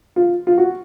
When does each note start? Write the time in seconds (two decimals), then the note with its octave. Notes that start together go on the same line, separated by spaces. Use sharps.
0.16 F4
0.47 F4
0.58 F#4